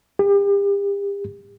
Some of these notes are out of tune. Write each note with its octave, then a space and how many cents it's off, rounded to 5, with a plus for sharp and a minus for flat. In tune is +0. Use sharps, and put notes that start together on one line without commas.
G4 +35